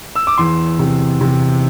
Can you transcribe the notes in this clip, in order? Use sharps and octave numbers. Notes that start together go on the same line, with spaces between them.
E6
D6
E2 C6
C3
C3